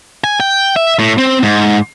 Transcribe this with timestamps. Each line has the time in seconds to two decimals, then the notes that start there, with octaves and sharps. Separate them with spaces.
0.24 G#5
0.40 G5
0.76 E5
0.99 A2
1.18 C4
1.43 G#2